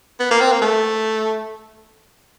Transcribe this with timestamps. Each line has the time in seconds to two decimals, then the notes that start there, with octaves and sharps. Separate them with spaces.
0.20 B3
0.31 A#3
0.41 C4
0.52 A#3
0.61 A3